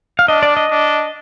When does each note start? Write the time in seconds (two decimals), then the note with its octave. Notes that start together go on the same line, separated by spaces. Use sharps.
0.19 F5
0.28 D4 D#5
0.43 D5
0.57 D#5
0.71 D4